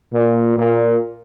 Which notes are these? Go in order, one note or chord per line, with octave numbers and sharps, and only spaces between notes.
A#2
A#2